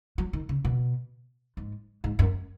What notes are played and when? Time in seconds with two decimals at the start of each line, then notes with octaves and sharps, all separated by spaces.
0.18 F#3
0.33 D#3
0.49 C#3
0.65 B2
1.57 G#2
2.04 G#2
2.19 F#2